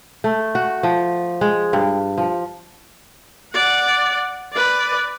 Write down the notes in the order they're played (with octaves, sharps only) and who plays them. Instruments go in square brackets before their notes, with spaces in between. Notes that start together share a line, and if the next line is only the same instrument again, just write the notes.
[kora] A3
F#4
F3
G#3
G2
F3
[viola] D5 F#5
B4 D5